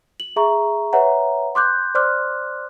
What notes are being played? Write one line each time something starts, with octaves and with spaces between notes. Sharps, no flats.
F#7
G#4 E5 A#5 C#6
B4 C#5 E5 F#5 A#5
C6 D6 F#6 G6
C5 D5 C6 D6 F6 F#6